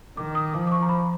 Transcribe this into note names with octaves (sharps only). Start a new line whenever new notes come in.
D#3 D6
D#6
F3 D6
D6
C#6
A#5
B5